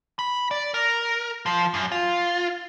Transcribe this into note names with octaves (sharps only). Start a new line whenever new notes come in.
B5
D5
A#4
F3
F#2
F4